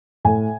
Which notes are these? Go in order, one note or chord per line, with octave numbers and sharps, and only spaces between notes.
A2 G#5